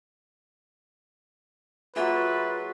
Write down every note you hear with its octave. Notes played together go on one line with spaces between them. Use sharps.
F#3 A#3 F4 G#4 B4 E5